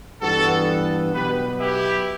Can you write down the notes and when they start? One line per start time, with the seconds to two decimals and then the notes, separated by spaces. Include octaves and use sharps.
0.21 G2 E3 B3 F#4 A4
1.14 B2 F#3 B3 G4 B4
1.60 E4 G4